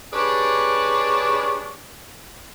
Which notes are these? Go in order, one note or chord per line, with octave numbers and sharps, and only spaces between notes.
D4 G4 G#4 B4 C#5 D5